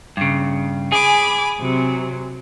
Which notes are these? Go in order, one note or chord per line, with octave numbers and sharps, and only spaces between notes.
G2 C#3
G#4 G#5 B5 D6
C3 F#3